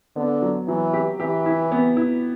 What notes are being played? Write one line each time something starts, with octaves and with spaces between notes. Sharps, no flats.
D3 B3
F#3
E3 F#3
G4
E3 G4
E4
B3
E4